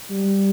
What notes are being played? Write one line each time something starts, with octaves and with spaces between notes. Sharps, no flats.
G3